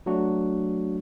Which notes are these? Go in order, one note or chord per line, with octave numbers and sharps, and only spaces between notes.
F#3 A3 D4 F#4